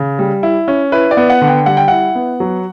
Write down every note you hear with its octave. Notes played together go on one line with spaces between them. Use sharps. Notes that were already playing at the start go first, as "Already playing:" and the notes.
Already playing: C#3
G3
E4
C#4
E4 B4
D5
B3
F#5
D3
G5
G3 F#5
G5
E4 F#5
B3
F#3